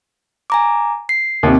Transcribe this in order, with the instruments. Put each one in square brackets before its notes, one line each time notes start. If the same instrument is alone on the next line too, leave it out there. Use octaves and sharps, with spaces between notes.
[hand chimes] G#5 A#5 D6
C7
[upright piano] D#2 C3